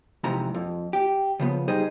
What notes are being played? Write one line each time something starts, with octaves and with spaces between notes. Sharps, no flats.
F2 G#2 C3 E3 A#5
F2
G4
C#3 F3 B3
G3 D#4 G#4 C5 D#5